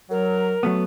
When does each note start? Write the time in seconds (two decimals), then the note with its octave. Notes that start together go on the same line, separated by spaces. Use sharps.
0.10 F#3 A#4
0.63 F#3 A3 B3